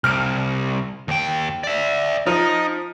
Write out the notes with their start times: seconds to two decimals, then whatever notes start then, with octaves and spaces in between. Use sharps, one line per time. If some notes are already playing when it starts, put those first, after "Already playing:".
0.04 C2 F6 D7
1.08 D#2 G5
1.64 D5 E5
2.27 F3 D#4